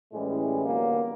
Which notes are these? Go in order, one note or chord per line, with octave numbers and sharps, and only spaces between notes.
A2 E3 G3 G#3 C#4
D3 F#3 G3 A#3 B3